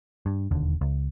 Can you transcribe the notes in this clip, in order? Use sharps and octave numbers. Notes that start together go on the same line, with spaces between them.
G2
E1 D#2 D3
C#2